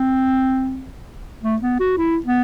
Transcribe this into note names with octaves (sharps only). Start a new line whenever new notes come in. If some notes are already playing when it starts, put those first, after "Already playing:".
Already playing: C4
A3
B3
F#4
E4
B3